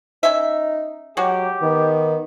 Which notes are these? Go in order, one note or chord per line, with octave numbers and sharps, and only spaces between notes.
C#4 D#4 E5
F#3 G#3 F#4 G4
D#3 B3